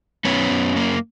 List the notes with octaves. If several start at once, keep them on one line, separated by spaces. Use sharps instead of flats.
F#2 B3 C#4
F#2
A#3